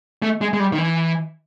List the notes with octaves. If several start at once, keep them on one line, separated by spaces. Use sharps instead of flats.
A3
G#3
G#3
G3
D#3
E3